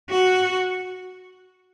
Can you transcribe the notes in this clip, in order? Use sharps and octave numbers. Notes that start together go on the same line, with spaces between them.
F#4